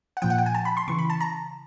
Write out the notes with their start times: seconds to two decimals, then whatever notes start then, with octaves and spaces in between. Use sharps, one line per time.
0.17 F#5
0.22 A#2 F3 G5
0.30 F#5
0.38 G5
0.46 G#5
0.55 A5
0.65 B5
0.77 C6
0.88 C#3 E3 C#6
0.99 B5
1.10 A5
1.21 A#5